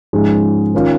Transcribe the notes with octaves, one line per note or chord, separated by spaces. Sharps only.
G#2 F3 G#3 C#4
D#3 C#4 F4